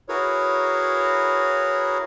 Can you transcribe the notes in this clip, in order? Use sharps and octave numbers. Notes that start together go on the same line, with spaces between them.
E4 F#4 G#4 A#4 B4 C#5